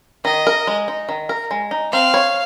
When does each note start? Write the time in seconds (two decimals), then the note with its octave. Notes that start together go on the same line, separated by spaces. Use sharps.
0.24 D#3 D#5
0.47 A#4
0.67 G#3
0.88 D#4
1.09 D#3
1.29 A#4
1.51 G#3
1.71 D#4
1.92 C4 F5
2.14 C#5